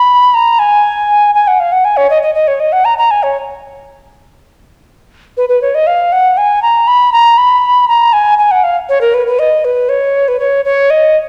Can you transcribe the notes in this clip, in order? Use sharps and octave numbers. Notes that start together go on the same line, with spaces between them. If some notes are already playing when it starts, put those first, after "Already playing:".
Already playing: B5
A#5
G#5
G#5
F#5
F5
F#5
G#5
C#5
D#5
D#5
D#5
C#5
D#5
F#5
A#5
A#5
G#5
C#5
B4
B4
C#5
D#5
F5
F#5
G#5
A#5
B5
A#5
B5
A#5
G#5
G#5
F#5
F5
C#5
A#4
B4
B4
D#5
B4
C#5
B4
C#5
C#5
D#5